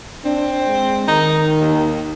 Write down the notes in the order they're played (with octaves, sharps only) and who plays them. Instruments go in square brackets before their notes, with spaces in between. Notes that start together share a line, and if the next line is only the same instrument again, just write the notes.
[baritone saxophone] C4 [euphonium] D4
[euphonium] G#3
[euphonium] D#3 [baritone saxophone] D#4
[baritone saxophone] D#2